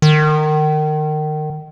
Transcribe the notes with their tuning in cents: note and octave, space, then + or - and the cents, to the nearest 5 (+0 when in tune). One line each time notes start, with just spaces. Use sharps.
D#3 -25